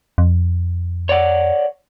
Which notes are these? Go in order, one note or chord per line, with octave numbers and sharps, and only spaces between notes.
F2
C#5 D5 F#5